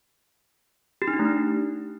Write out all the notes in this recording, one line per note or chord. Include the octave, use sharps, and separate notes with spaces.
G4
D#4
D4
A3
D#4